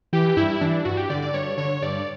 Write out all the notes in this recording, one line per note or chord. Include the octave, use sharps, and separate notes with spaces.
E3 G4
G2 E4
E3 D4
G2 F#4
G4
D3 D5
D5
G2 C#5
D3 C#5
G2 D5